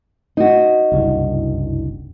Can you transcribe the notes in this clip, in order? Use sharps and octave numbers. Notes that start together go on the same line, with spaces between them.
D#4 F#4
F#1 C2 G2